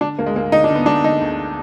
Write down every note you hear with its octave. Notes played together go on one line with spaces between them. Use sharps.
D3 D4
D2 A#3
G#3
D2 A#3
D3 D#4
D4
D3 B3
D3 D4
D3 D#4
D2